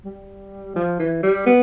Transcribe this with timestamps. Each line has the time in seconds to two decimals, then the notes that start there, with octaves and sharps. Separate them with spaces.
0.05 G3
0.76 F3
0.99 E3
1.23 G3
1.46 B3